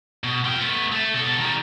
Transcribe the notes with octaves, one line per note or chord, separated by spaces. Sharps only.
B2
F4 G5
A3 B3
A3
B2 A4
D#3 G3